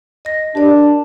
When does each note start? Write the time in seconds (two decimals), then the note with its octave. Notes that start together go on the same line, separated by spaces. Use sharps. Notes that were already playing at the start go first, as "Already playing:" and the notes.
0.25 D#5 A#6
0.55 D4 G4 A#4 D5